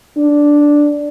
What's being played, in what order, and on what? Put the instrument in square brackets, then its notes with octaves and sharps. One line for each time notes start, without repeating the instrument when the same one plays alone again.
[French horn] D4